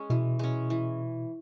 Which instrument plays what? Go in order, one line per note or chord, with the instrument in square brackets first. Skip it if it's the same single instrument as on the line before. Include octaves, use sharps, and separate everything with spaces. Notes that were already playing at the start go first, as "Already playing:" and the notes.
Already playing: [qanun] G#3 C#4
[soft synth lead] B2 [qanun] E3
[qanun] G#3 C#4
E3